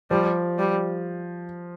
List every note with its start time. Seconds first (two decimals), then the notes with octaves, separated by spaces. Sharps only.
0.11 F3 G3
0.59 G3